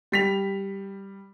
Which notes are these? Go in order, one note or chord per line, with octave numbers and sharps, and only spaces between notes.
G3 B6 F7